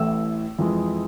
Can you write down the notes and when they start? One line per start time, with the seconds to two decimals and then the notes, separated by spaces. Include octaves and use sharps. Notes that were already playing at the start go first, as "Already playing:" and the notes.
Already playing: A1 A2 E3 A3 E6
0.59 F2 E3 G#3